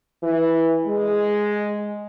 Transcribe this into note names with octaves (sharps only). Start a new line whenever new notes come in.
E3
G#3